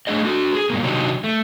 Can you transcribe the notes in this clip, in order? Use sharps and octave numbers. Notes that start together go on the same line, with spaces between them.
A3 D4 G#4 D#5
D4 F#4 A4
G#4
G2 B2 A#3
C3 D#3 F#3 D4 D#4 G4
A3